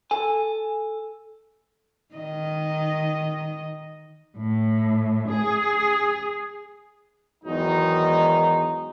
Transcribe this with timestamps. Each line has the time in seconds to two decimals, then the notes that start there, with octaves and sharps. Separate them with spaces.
0.11 A4 G#5
2.14 D#3 D#5
4.39 A2
5.28 G#4
7.44 E2 G#2 D#3 F#3 D#4